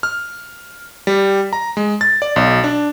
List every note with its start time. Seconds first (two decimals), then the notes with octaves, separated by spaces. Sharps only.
0.03 F6
1.07 G3
1.53 A#5
1.77 G#3
2.01 A6
2.22 D5
2.36 B1
2.64 D4